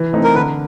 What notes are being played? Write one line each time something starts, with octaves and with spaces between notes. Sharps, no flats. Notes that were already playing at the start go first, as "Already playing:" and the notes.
Already playing: E3
A3 C4 D#4
A#4
D3 B4